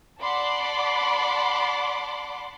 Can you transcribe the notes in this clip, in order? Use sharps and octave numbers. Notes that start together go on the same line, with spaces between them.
D5 F#5 A5 B5 C6 D6